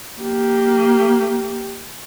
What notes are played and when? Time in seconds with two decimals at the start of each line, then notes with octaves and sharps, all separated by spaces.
0.20 A#3 G4